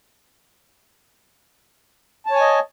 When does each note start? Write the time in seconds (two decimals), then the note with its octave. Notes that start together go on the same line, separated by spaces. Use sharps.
2.26 A5
2.31 C#5
2.36 G#5
2.41 D#5